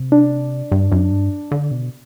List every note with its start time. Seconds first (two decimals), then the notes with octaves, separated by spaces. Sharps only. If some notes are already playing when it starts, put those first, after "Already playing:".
Already playing: C3
0.12 D4
0.72 G2
0.92 F#2
1.11 G2
1.51 D3
1.71 B2